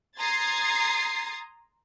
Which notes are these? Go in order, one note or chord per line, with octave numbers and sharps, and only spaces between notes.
A#5 C6 D#6 G#6 A6 C7